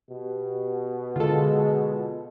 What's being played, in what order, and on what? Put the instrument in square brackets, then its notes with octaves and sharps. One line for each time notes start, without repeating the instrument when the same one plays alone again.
[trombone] B2 [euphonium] G4
[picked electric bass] D3 [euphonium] G#3 [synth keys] F4 A4